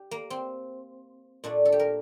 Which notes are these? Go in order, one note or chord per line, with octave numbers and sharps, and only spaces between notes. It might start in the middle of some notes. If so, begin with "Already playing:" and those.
Already playing: G4
A#3
C4
A#2 A3 D4
A4
G4
A#4